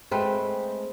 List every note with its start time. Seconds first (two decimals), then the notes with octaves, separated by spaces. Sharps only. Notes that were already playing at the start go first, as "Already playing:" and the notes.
0.11 G#3 A3 C4 B4